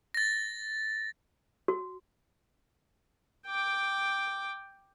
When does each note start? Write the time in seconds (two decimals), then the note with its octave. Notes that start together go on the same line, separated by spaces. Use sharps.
0.14 A6 A#6
1.68 F#4
3.47 G5 D6